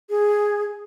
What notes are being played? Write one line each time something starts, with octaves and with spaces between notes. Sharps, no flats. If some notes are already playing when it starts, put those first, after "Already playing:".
G#4